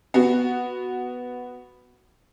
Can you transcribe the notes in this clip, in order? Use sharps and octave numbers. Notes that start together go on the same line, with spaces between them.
B3 F#4